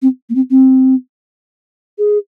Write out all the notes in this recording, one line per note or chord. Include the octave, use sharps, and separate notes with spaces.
C4
A#3
C4
C4
G#4